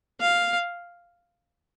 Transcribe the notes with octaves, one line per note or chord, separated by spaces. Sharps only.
F5